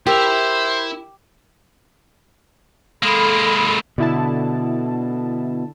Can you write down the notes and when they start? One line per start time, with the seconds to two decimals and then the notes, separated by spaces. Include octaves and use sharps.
0.07 E4 G4 A#4 C5 E5 E6 F7
3.03 G#3 A#3 A4 B5
3.98 B2 D3 E4 A5